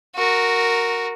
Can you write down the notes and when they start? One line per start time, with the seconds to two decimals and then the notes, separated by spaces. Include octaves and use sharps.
0.16 F#4 A#4